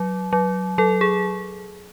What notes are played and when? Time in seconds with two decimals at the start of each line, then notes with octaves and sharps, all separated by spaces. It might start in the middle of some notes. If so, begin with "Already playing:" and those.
Already playing: F#3
0.33 F#3
0.78 F#3 A4
1.01 G#4